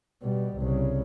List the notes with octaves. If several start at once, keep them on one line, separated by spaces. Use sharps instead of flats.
B2 G3
C2 C#3